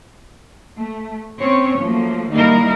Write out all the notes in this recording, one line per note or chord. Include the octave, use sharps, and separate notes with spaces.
A3
C4 C#4 C#5
F3 F#3 A3 A#3
D#3 G3 A#3 D#4 E4 A#4